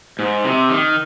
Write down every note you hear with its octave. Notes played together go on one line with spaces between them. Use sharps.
G#2
C3
D#3